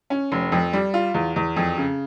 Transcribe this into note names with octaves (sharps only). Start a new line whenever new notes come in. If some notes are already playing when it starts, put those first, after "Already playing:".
C#4
F1
F2
G3
F4
E2
E2
F2
C#3